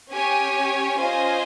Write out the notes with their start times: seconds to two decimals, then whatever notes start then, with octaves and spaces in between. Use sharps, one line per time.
0.12 C#4 G4 C#5 G#5
0.97 C#4 F4 C5 D#5 G#5